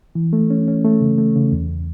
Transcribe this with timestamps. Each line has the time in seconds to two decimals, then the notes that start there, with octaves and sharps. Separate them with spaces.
0.15 E3
0.33 A3
0.50 C#4
0.68 C#4
0.85 A3
1.00 C#3
1.18 A3
1.36 C#3
1.52 E2